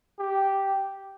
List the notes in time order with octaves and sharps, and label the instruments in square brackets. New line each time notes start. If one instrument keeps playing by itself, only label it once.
[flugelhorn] G4